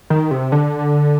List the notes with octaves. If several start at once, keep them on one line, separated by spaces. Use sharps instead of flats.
D#3
C3
D3